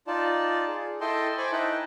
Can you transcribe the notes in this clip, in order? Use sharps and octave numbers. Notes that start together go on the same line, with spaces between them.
D#4 F4 D5 A5
G#4
E4 A4 D#5 G5 A5 C6
C5 G#5 B5 C#6 D6
D#4 E4 B4 D#5 G5 A5